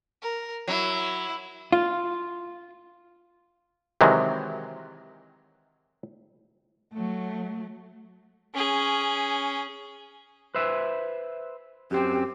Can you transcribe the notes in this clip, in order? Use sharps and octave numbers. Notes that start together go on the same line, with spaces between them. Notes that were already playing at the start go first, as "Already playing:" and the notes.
A#4
F#3 E4
F4
C3 D#3 E3 F#3 G#3
F#3 A3
C#4 G#4
B4 C5 E5
F#2 C4 G4